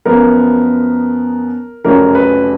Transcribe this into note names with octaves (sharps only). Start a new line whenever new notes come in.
F#2 F3 B3 A#4
F1 F2 C#3 F#3 A#4
B4